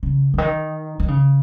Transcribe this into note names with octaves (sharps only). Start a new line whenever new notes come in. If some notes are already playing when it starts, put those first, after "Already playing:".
C#3
C#3
D#3
D#3
C#3